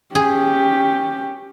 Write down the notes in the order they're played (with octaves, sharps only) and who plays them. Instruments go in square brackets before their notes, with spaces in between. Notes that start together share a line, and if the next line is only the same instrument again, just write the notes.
[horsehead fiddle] C#4 G4 [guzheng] G#4